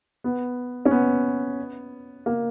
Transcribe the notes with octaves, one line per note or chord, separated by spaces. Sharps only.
B3
C#4
B3
A#3